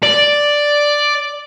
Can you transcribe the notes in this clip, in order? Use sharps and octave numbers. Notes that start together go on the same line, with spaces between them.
D5